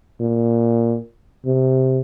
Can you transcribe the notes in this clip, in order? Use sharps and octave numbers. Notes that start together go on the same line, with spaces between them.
A#2
C3